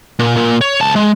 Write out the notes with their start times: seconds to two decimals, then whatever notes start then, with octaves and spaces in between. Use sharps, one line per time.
0.19 A#2
0.36 A#2
0.61 C#5
0.80 C#2 A5
0.96 G#3